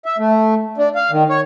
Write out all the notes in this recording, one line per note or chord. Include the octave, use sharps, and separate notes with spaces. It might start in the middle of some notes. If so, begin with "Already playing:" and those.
E5
A3
D4
F5
D#3
C#5